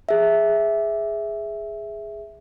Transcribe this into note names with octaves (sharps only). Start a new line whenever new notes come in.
G#4 E5